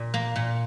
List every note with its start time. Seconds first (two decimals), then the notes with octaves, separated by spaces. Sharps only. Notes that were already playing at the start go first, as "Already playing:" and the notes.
Already playing: A#2
0.14 A#3
0.36 A#2